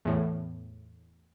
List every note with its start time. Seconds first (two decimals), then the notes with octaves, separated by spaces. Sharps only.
0.05 E2 A2